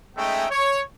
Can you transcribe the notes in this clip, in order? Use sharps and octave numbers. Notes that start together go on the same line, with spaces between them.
G#3 A3 C#4 D#4 E5 G5
C#5